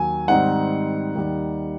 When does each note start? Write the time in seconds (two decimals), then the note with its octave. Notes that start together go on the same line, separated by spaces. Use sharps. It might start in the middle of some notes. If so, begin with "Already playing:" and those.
Already playing: D#2 F#3 G#5
0.28 G#2 D#3 G3 C4 D#4 F#5
1.15 D#2 D#3 G3